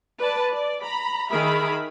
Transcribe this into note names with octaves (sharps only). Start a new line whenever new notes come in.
B4 D5 A5
D5
A#5 B5
D#3 G#4 A#4 E5 B5